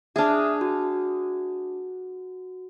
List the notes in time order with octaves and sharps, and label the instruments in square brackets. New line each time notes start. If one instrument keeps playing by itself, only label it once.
[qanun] D4 G#4 [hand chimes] E5 D#6 F6
[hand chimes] F#4